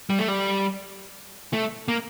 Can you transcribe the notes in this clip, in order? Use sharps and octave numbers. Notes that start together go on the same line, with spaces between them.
G3
A3
G3
A3
A#3